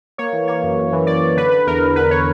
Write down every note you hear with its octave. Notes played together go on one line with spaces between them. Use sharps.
A#3 C#5
E3
A#3 C#5
F#2
F#2
E3
F#2 D5
F#2
D3 B4
D3 B4
E2 A#4
E2
D3 B4
C#5